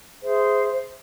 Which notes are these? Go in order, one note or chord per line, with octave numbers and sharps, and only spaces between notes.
G#4 C5 E5